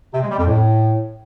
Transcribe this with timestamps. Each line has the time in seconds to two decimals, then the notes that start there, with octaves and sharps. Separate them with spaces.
0.14 C3
0.22 G#3
0.30 G3
0.38 F2
0.47 A2